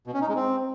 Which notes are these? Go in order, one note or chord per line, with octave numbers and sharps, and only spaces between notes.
B2
C#4
D#4
G#3
C4